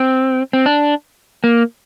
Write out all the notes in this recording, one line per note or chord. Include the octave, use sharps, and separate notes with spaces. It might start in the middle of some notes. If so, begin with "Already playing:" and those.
Already playing: C4
C4
D4
A#3